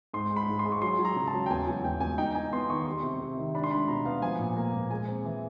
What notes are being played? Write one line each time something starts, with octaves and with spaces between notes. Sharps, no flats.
G#2 C6
G#3
B5
G#2
C6
G#3
C#6
F#3 C6
F#3
A#5
C#3
A5
F#3
G5
E2 G#5
F#3 G#5
E2 G5
E2 G#5
D#4 G5
D#4 G#5
B3 C6
D#3 C#6
G3 C6
C3
C3
D#3
D4 B5
C6
D4 B5
B2 A#5
B3 F5
F3 G#5
A#2
A#3
A#2
G#3 G#5
C4
E3